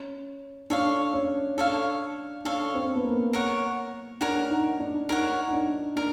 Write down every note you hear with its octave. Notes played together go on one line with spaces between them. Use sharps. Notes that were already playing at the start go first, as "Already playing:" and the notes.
Already playing: C#4
D4 A4 C#5 F5
C#4
D4 A4 C#5 F5
D4 A4 C#5 F5
C4
B3
A#3
A#4 C#5 F#5
D4 A#4 C#5 F#5
D#4
D4
D#4 A#4 C#5 F#5
D#4
D4
D4 A#4